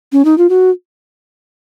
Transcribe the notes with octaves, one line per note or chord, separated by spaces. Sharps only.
C#4
D#4
F4
F#4